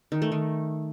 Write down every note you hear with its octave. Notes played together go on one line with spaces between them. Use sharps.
D#3
A3
D#3